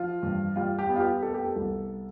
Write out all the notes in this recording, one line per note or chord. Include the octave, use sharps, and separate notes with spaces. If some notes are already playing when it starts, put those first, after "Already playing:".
Already playing: F3 F4
G2
G3 F4
G4
B3
F4
G4
B3 A4
G4
A4
C2